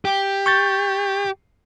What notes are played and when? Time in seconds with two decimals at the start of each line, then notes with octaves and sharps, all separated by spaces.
0.05 G4
0.46 C#6 G6 A6